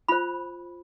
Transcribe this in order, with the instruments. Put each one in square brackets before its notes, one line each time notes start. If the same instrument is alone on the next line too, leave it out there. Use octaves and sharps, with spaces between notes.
[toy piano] F4 C5 B5